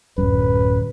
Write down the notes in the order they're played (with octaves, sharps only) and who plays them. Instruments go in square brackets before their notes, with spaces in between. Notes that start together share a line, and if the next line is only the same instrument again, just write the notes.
[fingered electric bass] D1 F#2 [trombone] B4